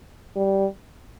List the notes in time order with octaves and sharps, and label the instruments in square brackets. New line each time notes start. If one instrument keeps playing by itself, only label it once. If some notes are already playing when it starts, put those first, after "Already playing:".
[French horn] G3